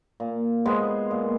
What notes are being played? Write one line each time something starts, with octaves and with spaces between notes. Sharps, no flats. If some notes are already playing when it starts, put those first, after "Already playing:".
A#2
G#3 B3
A#2